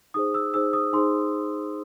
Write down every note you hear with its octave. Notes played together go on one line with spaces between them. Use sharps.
D#4 G#4 C5 D#6
E6
D#4 G#4 C5 E6
D#6
D#4 G#4 C5 C6